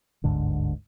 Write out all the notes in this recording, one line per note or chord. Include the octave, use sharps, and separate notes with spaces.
G1 D2 G#2 D3